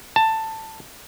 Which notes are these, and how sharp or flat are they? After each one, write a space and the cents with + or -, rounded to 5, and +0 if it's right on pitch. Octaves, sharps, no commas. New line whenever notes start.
A5 +15